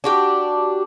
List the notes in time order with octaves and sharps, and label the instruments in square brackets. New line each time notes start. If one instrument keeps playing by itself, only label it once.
[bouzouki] D4 F#4 G4